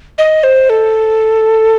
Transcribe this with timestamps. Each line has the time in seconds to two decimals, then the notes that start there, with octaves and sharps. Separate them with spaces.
0.18 D#5
0.44 C5
0.70 A4